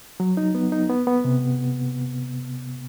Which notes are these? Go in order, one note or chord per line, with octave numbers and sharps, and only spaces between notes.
F#3
D#4
B3
D#4
B3
B3
C3